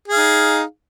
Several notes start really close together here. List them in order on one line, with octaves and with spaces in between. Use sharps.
G#4 F5 D#4